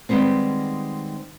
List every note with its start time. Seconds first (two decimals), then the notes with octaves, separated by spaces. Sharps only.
0.09 D#3 G3 G#3 B3 C4